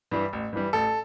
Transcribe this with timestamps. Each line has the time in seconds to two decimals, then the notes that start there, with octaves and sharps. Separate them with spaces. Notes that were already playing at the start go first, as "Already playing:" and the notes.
0.11 G2 E3 G3
0.33 A1
0.53 G2 E3 G3
0.73 A1 A4